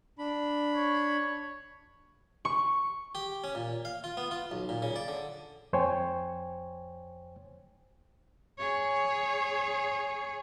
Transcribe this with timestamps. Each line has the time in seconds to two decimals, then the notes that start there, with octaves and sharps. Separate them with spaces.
0.18 D4 B5
0.76 C#5
2.45 C#6
3.15 G4
3.44 C#4
3.55 A#2
3.85 F5
4.04 F4
4.17 B3
4.31 F4
4.51 B1
4.69 A#2
4.82 C#3
4.96 D5
5.08 D3
5.73 F2 C5 C#5 G5 G#5
8.59 G#4 C#5